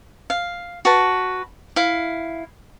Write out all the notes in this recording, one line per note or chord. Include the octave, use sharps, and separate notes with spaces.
F5
F#4 B4 A5
E4 F5